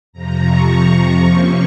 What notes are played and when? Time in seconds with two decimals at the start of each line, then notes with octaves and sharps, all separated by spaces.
0.13 F2 C3 F3 A#5
0.41 C#6
0.97 C#6
1.27 C3 F3 A#3 C#4